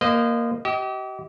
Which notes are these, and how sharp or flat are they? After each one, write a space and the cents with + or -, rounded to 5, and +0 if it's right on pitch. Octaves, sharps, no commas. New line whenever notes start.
A#3 +0 C5 -35 D#5 -20
G4 -35 D#5 +30